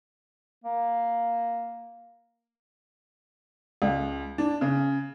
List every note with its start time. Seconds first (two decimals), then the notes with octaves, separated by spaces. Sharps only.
0.64 A#3
3.82 C#2
4.38 D4
4.61 C#3